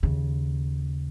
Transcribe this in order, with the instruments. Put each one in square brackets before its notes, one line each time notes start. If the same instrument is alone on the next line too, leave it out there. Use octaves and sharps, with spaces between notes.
[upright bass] D#2 C#3